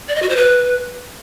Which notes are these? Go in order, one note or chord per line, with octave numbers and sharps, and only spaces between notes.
D5
D#5
F#4
C5
B4